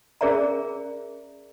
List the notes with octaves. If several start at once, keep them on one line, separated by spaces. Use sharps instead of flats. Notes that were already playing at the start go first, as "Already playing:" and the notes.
C#4 G#4 A#4 D5 E5 A#5